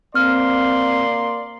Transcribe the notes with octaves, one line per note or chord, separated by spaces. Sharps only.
A#3 C4 D5 C6 F6